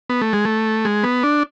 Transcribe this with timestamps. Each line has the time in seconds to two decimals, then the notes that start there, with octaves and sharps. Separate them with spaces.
0.10 B3
0.22 A3
0.33 G#3
0.45 A3
0.85 G#3
1.03 B3
1.23 D4